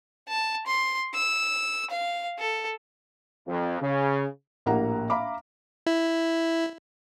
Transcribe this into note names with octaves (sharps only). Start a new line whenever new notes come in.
A5
C6
E6
F5
A4
F2
C#3
A#1 A2 A#3 G4 F#5 A#5
E5 F5 A#5 B5 D6
E4